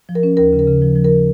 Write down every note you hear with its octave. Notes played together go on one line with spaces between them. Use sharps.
F3
A#4
C#4
D#2 A#4
C#3
A#4
C#3
F3
F3
A#4